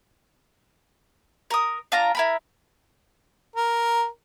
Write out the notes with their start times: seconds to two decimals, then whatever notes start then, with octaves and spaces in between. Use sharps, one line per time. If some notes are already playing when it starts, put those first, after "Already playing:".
1.51 A#4 D#6
1.92 D4 F4 A#5
2.15 E4 A#4 B5
3.56 A#4